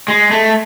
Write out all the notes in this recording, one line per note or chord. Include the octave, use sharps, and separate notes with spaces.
G#3
A3